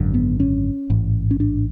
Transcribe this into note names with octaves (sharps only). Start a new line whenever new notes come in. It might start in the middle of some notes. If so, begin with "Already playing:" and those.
Already playing: G#1 F#2 D3
B3
C#4
A1 G#2
C#4
D4